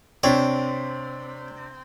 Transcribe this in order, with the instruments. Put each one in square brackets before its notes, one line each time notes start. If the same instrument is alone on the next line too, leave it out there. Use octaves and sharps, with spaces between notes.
[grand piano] C3 D4 [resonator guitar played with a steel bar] C4 [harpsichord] C#5